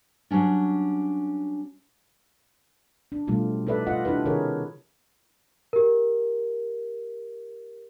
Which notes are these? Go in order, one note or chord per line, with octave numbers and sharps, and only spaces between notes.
F#3 G3 C#4 D4
D4
B2 F3 G3 A3 F4
D#4 A4 B4 D5 E5
F4 D#5 F#5
D4 E4 G4 B4
C3 D#3 E4 G#4 A#4 C#5
G4 A#4